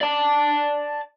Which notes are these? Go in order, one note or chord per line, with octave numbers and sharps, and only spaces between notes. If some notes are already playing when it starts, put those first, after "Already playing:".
D5 A5